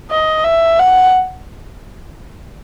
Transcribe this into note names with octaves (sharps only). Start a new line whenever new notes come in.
D#5
E5
F#5